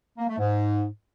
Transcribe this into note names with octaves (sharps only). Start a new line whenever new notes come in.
A#3
A3
G#2